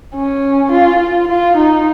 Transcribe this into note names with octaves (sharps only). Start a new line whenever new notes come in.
C#4
F4
F4
F4
D#4